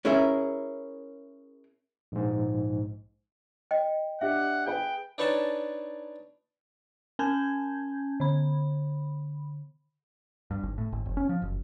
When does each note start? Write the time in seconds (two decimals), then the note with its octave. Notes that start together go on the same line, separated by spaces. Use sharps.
0.05 C#4 E4 G#4 A#4 E5
2.12 A#1 G#2
3.71 D#5 G5
4.21 D4 G4 E5 F#5
4.66 G#4 B4 G5
5.18 D4 D#4 B4 C#5 G#5 A5
7.19 C#4 G#5 A5 G6 G#6
8.20 D3 B5
10.51 G2
10.63 G#1
10.78 A2
10.92 G#1
11.06 F1
11.17 C#4
11.29 F3
11.42 F#1